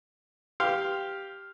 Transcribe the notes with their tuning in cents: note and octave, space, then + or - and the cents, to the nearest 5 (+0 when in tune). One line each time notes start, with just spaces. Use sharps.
G4 +0 F5 +0 C6 +0